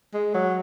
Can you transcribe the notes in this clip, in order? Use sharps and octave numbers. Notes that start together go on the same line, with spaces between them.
G#3
F#3